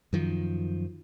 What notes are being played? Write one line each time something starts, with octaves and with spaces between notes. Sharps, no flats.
F#2 D#3 F3